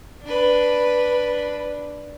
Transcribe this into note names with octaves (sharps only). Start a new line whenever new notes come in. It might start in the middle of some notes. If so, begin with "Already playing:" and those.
D4 B4